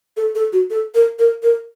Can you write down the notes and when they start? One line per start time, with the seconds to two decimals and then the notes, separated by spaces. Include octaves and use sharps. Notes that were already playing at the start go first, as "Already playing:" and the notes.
0.17 A4
0.35 A4
0.53 F#4
0.70 A4
0.95 A#4
1.19 A#4
1.43 A#4